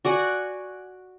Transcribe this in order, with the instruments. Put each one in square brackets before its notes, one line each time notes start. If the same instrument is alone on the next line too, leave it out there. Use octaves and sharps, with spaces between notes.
[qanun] F#4 D5 F#5 G#5